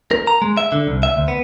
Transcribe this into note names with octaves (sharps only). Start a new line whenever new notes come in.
A#4
A#5
G#3
E5
D3
C2
E5
D2
B3